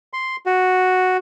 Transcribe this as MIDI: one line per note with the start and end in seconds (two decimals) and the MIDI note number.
0.13 0.36 84
0.46 1.17 66